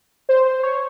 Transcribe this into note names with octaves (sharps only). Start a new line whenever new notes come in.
C5
C5
C#5